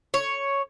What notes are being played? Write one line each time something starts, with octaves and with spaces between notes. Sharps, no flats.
C#5